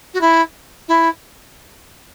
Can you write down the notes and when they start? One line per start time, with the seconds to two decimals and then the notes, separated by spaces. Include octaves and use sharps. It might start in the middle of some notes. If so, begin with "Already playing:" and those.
0.14 F#4
0.21 E4
0.88 E4